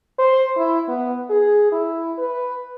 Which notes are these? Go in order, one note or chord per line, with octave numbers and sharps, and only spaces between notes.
C5
E4
B3
G#4
E4
B4